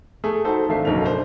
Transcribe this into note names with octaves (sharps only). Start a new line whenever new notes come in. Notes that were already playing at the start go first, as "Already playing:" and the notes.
A3 G#4 A4
D#4 F#4 A4 C5
G#1 A3 D4 E5 F5 C7
F#1 B1 B2 A#3 F7
D4 C5